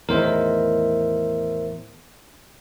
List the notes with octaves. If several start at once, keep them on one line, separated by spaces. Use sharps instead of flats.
E2 A2 D#3 A#4 C5 E5